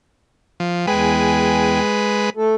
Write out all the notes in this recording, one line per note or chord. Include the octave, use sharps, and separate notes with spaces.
F3
E2 G#3 B4 G5 G#5
A3 A4